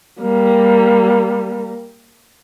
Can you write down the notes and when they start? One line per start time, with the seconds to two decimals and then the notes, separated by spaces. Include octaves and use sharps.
0.21 G3 A#3